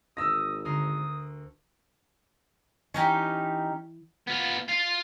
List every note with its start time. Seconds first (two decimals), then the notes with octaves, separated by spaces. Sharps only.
0.17 G#1 D#6 E6 A#6
0.65 D2 A#4 C6 D#6
2.94 E3 C#4 D#4 G4
4.27 B3 F4
4.69 F4 F5